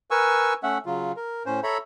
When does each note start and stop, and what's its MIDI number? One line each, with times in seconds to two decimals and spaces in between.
0.11 0.54 70
0.11 0.54 71
0.11 0.54 80
0.11 0.54 85
0.11 0.54 88
0.63 0.78 57
0.63 0.78 61
0.63 0.78 76
0.63 0.78 78
0.86 1.12 49
0.86 1.12 54
0.86 1.12 65
1.17 1.43 70
1.46 1.60 45
1.46 1.60 61
1.46 1.60 72
1.63 1.78 69
1.63 1.78 73
1.63 1.78 76
1.63 1.78 82
1.63 1.78 83